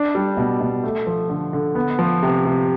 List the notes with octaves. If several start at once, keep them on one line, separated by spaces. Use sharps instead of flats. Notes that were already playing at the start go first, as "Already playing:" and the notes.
Already playing: D4
G3
B2
B2
A3
F3
D3
D3
B3
F3
C3
C3